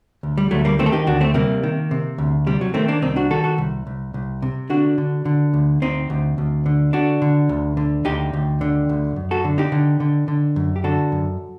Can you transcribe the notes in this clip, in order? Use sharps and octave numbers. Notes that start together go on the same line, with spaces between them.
D2
G3
D2 F#3 A3
G3 A#3
D#3 A3 C4
A4
D#4 G4
D2 D4 F#4
A3 C4
C3 G3 A#3
D#3
C3
D2
C3 G3
F#3
D#3 A3 C4
A#3 D4
C2 C4 D#4
D4 F#4
D#3 F#4 A4
F#4 A4
C2
C2
C2
C3
D3 D4 F#4
D3
D3
D2
D2 C4 D#4
D2
D2
D3
D3 D4 F#4
D3
D2
D3
D2 D#4 G4
D2
D3
D2
F#2
F#4 A4
D3
D#4 G4
D3
D3
D3
F#2
G4
D3 F#4 A4
F#2